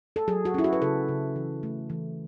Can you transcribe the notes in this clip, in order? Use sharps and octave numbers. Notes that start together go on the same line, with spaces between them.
A4
F#3 G#4
F#4
C#4 E4
F#4
B4
C#3 A4
C#3
E3
A3
E3